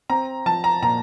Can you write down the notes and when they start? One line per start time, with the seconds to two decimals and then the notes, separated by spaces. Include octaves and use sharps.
0.10 C4 A#5
0.46 F3 A5
0.64 A#5
0.82 A#2 A#5